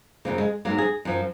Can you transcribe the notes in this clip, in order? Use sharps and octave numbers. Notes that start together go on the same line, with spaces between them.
F#2 C#3 F3 A#3
G#3
G#2 F#3 A#3
G#4
F#2 F3